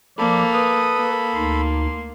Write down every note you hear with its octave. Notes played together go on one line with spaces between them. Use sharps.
F3 A#3 A4 D5 B5
B4 D#6
A#3
D2 D#4 C6